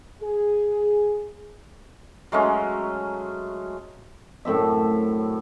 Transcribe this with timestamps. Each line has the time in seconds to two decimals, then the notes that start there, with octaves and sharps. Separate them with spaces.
0.22 G#4
2.32 F#3 G#3 A3 C#4
4.45 F#2 A2 C4 E5